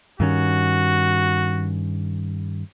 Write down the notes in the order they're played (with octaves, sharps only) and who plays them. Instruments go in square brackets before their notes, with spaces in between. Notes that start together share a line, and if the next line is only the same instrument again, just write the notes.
[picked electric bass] G2 D#3 C#4 [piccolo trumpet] F#4